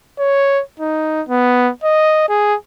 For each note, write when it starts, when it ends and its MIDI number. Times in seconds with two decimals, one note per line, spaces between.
0.19 0.62 73
0.80 1.22 63
1.29 1.70 59
1.84 2.28 75
2.29 2.55 68